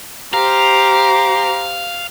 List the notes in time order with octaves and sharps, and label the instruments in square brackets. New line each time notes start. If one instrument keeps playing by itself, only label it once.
[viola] G4 C5 [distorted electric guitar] F5 [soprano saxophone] A#5